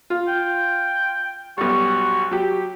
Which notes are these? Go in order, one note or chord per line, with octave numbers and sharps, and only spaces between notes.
F4
G5
B1 G3 F#4
F#3 G4